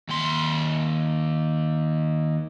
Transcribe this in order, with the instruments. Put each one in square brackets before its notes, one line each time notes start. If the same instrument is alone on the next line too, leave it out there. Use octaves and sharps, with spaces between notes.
[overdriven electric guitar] D#2 C6